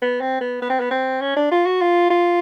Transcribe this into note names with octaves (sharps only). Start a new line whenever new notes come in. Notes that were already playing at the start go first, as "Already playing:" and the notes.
B3
C4
B3
B3
C4
B3
C4
C#4
D4
F4
F#4
F4
F4